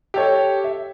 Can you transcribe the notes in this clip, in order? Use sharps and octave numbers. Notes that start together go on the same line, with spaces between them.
G4 A4 C#5
E5